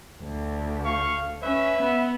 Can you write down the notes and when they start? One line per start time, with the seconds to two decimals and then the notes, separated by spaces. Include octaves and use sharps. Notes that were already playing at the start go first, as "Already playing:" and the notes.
0.23 D2
0.83 F5 C#6
1.42 C#4 B4 E5
1.82 B3